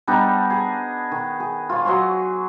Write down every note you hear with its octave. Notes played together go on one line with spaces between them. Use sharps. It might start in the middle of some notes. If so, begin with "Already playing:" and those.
G3 B3 D4 D#4
G#4
D#3
G#4
F4 C#5
F#3 D#5 C6 C#6